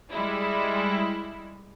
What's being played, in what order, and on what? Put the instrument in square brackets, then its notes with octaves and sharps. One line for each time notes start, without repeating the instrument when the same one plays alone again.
[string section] G3 G#3 E4